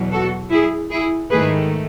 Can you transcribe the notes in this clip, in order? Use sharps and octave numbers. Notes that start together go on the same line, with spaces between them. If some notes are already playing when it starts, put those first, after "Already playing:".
Already playing: E2 B2 F#3
F#4 A4
E4 G#4
E4 G#4
G#2 D#3 A3 G#4 B4